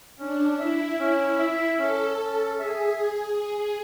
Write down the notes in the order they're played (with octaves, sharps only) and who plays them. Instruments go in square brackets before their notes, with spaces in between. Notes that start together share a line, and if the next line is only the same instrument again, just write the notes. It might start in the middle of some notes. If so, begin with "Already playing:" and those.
[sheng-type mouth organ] C#4 [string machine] D4
[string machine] E4 [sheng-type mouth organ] E5
[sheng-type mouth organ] C#4 [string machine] E4
[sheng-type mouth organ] E5
[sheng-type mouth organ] C#4 [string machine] A4
[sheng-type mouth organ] C#4
[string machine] G#4 [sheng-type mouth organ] E5